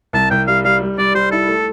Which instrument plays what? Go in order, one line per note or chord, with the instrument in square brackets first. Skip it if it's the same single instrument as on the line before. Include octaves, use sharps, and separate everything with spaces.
[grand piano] C2 [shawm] A5
[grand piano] C2 [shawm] G5
[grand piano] G3 [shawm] F5
[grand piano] G3 [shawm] F5
[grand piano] G3
[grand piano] G3 [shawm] D5
[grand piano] G3 [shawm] C5
[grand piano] E4 [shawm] A4
[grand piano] A3